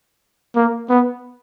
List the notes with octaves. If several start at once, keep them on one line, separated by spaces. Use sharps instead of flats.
A#3
B3